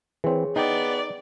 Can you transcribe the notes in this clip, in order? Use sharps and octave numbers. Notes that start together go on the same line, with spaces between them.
E3 C4 G#4 C#5
B3 D#4 D5 G5 A#5